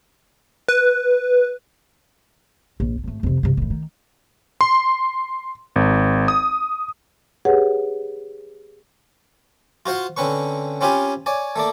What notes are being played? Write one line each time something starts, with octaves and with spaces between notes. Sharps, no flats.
B4
A#1
G#1 A3
F2 C3
G2 C3
A2 D#3
D#3
C6
G#1
D#6
G4 G#4 B4 C#5 F#5
F4 F#4 C5 F5 F#5
D3 C4 C#4 B4 C#6
C4 C#4 F4 G4 G#5 B5
C#5 D5 G#5
A3 A#3 D5